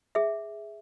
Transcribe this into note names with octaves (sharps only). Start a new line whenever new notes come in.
G#4 E5